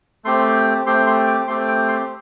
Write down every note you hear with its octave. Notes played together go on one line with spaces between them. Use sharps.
A3 C4 G4 C6
A3 C4 G4 C6
C6
D6
A3 C4 G4 C6
D6
C6